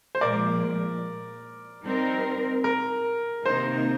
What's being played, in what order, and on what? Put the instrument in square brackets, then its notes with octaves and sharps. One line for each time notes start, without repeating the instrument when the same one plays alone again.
[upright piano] C5
[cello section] A#2 F3 G#3 [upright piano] A#4 D5
[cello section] G3 C4 D#4 A#4
[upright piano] A#4
[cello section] C3 D#3 A#3 D#4 A#4 [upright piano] C5